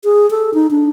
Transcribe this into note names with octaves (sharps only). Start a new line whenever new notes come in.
G#4
A4
D#4
D4